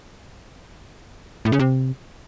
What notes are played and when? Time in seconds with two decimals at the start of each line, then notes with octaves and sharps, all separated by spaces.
1.45 A2
1.52 C#3
1.59 C3